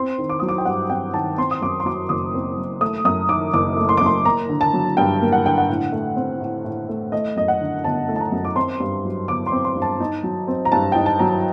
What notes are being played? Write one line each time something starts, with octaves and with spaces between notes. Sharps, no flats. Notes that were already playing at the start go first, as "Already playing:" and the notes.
Already playing: C4 C6
D#3
D6
F#3 D#6
D6
G5
G2 F#5
C4 G5
D#3 A5
C4 C6
D#6
F#2 D6
C6
F#3 D6
F#1 D#6
C4
F#2
A3 D#6
F#2 D#6
D#3 D6
F#1 D6
A3
C6
D6
F#2 C6
A#3 A#5
D3
A5
F#3
G2 G5
A#3
F#5
D3 G5
F#5
A2
A3
C4
A2
A2
A3
A3 D#5
F#2 D#5
F#5
D3
G1 A5
A3
A5
A#5
F#2
D6
C4 C6
G2
F#3
G1 D6
C6
C4
C6
G2
A5
D#4
F#3
C4
A#5
G2 A5
D#4 G5
A5
F#3 A#5